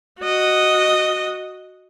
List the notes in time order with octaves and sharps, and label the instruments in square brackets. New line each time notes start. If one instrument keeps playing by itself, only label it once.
[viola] F#4 D#5